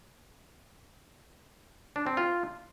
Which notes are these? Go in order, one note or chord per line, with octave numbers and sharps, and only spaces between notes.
D4
C4
F4